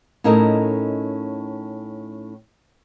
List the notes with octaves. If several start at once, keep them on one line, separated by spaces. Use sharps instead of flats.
A2 C#4 D#4 A4 A#4 D#5